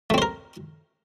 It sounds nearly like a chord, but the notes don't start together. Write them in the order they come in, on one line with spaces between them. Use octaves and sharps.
A3 C4 C5 A#4